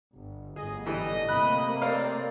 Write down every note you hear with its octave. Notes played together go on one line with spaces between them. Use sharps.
G1
G1 A2 G#4 D#5
E3 G3 A3 D#5
C3 A3 A#3 B5 F#6
C4 A#4 C#5 D5 F5